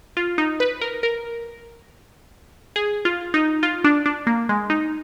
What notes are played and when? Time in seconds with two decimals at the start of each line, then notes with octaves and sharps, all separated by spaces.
0.17 F4
0.38 D#4
0.60 B4
0.81 A#4
1.03 A#4
2.76 G#4
3.05 F4
3.34 D#4
3.63 F4
3.84 D4
4.06 D4
4.27 A#3
4.49 G#3
4.70 D#4